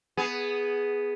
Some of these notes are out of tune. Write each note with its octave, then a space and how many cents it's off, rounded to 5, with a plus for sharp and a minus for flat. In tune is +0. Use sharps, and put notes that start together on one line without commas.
B3 +0 G#4 +0